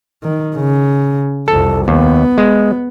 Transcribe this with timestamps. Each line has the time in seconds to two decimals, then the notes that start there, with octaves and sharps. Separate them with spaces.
0.23 D#3
0.56 C#3
1.48 C2 F2 A4
1.88 D#2 B3
2.38 G#3